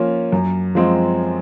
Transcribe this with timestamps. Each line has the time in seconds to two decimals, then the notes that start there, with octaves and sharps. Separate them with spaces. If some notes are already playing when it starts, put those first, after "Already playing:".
Already playing: F3 A#3 C#4 F4
0.32 F#2
0.75 F3 G#3 C4 F4